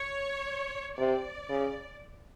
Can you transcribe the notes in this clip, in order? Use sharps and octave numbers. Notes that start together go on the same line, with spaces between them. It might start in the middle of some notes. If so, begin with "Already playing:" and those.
Already playing: C#5
C3 D5
C#3